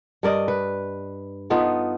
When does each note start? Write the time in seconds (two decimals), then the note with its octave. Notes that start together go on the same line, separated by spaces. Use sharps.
0.23 G2 A#4 D5 D#5
0.48 B4
1.50 B3 D#4 F4 A4